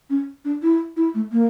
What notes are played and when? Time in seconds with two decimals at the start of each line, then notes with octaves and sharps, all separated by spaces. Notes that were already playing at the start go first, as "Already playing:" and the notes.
0.10 C#4
0.45 D4
0.62 E4
0.97 E4
1.14 A3
1.32 A#3